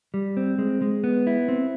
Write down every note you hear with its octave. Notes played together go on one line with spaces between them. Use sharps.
G3
C4
G#3
G#3
B3
E4
C4